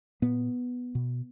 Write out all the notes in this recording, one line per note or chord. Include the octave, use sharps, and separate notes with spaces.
A#2 B3
B2